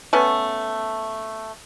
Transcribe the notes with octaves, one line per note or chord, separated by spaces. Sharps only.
A3 B3 C#4